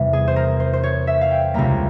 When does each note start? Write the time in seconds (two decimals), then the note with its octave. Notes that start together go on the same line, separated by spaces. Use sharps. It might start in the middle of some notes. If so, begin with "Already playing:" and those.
Already playing: E2 C3 G3 E5
0.13 G#4
0.28 C5
0.36 A#4
0.60 C5
0.73 C5
0.83 C#5
1.07 E5
1.21 F5
1.31 G5
1.54 C#2 C3 G3 A#3 A#5